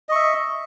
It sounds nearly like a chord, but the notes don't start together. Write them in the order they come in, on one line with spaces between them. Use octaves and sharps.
D#5 C#6 E5